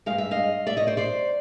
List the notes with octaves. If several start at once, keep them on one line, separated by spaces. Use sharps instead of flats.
G2 E3 G#3 F5
E5
D#5 F5
D5 E5
C#5 D#5
C5 D5
C5 D5